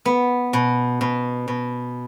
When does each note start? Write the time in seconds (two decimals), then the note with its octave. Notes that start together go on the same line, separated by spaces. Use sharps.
0.05 B3
0.53 B2
1.01 B2
1.48 B2